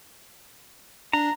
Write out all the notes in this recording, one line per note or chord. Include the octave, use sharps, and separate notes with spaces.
D4 A#5